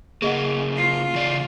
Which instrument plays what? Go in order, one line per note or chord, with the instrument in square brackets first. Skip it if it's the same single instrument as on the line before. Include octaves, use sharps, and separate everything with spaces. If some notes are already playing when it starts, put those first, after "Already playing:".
[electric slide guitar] C#3 A#3 [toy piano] G#4 D#5 F#5
[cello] F4
[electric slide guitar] E2 C#3 D5